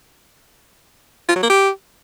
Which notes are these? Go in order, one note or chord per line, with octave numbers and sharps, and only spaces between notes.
F4
F#3
A#3
G4